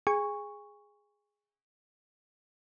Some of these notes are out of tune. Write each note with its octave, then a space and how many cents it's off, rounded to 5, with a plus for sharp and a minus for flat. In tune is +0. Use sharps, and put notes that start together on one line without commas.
G#4 +0 G#5 -35 C#6 +0